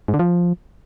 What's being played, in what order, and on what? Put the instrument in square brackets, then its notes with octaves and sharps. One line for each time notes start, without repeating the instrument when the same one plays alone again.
[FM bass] G#2
D3
F3